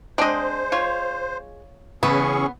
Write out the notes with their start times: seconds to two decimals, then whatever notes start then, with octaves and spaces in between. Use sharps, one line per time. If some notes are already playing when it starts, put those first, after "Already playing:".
0.18 G#3 C4 D4 C5 D#5
0.72 F4 C#5
2.03 C#3 E3 B3 C#4 G#4 C#6